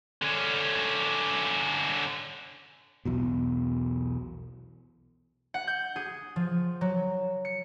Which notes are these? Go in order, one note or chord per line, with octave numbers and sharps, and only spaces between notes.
D3 C#4
B1 E2 B2
F#5
G6
G#4
F3
F#3
C#7